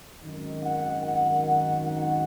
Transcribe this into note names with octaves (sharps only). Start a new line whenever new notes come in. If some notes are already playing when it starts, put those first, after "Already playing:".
G#1 F#2 D#3
F#5
F#5
F#5
F#5